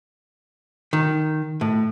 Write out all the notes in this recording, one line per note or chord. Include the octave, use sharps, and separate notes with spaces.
D#3
A2